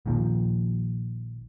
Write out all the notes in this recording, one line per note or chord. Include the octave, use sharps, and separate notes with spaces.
A#1 A#2 D#3 F3